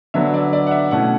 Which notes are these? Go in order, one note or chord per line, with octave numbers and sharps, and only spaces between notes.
D3 F#3 B3 D4 E5
D5
D5
F#5
E5
B2 A3 C#4 E4 F#5